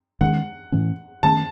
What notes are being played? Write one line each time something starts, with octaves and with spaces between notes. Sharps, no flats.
D#3 G#3 C#4 F#5
A2 E3 A3 C#4
D#3 A3 C#4 A5